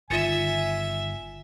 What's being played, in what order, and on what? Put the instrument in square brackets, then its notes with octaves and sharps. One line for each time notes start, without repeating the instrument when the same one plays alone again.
[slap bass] G1 D#3 [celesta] F4 A6 C#7 [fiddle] E5 [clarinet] G#5